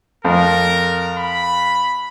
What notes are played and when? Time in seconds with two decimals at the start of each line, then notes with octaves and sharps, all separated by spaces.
0.25 F2 A#4
1.17 B5